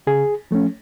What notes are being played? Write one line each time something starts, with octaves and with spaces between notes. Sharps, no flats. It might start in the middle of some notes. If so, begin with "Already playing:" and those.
C#3 G#4
F3 A3 C#4